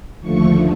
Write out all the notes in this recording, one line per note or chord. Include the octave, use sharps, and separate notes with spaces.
D#2 D3 F3 A3 C#6